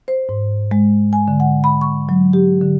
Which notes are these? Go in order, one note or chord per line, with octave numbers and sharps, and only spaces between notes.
C5
G#2
G#3
G#5
D3
F#5
B5
C#6
F#3
G4
D3